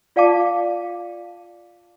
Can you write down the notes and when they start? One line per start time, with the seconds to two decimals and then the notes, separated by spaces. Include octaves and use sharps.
0.16 F4 D5 F5 G5 A5 D6